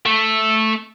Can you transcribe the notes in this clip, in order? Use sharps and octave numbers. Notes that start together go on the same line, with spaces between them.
A3